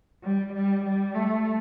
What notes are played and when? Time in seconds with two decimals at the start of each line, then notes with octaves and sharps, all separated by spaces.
0.23 G3
0.53 G3
0.85 G3
1.15 A3